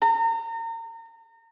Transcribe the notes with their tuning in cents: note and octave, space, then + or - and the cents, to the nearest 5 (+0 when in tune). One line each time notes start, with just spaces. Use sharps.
A#5 -35